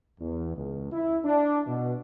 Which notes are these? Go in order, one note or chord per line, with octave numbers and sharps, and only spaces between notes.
E2
C#2
E4
D4
B2